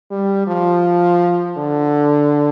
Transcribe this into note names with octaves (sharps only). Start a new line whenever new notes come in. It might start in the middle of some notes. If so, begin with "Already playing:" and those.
G3
F3
D3